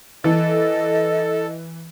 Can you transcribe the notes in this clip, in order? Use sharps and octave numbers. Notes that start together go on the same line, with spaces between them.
E3 A4 D#5